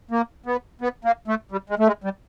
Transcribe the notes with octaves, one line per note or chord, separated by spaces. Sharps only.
A#3
B3
B3
A#3
A3
G3
G#3
A3
G#3
G3